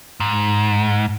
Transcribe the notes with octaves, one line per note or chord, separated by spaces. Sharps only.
G#2